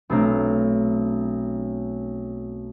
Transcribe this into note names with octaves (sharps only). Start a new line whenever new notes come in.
B1 A3 C4 D4 A#5 F#6